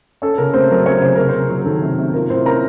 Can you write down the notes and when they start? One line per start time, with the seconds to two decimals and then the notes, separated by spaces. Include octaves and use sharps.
0.22 C#4 A4
0.38 C#3 A#4
0.54 A3 C4 C5
0.71 F#3 A#4
0.86 C#4 C#5
1.02 C#3 C5
1.16 C3 A#4
1.29 C4 C5
1.35 C3
1.50 F#3
1.66 D#3 A4
1.82 C3
1.98 C3
2.14 F4 A#4
2.30 A2 C4 C5
2.46 C#4 A#4 A#5